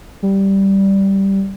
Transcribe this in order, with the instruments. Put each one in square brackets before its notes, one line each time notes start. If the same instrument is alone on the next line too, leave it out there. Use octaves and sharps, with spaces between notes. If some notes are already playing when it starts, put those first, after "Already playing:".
[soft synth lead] G3